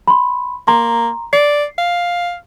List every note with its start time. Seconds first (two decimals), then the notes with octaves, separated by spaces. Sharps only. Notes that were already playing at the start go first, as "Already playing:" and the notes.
0.08 B5 C6
0.68 A#3 A#5 C6
1.33 D5 C7
1.78 F5